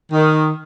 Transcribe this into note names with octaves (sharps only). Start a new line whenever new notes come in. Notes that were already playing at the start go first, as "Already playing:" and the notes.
D#3